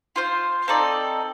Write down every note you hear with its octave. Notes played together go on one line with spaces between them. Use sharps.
F4 C5 F5
C4 D#4 A4 D5